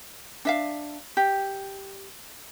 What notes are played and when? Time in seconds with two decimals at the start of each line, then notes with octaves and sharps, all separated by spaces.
0.45 D4 E5 F5
1.17 G4